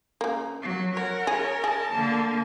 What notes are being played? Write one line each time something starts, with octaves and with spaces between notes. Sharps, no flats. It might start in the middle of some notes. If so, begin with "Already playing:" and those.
C#3 A#3
F#3
A#4 C#5 F#5
G#4 C#5
G#4 A5
D3 A#3